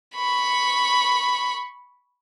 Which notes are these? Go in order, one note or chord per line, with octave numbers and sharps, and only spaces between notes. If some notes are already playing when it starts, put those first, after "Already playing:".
B5 C#6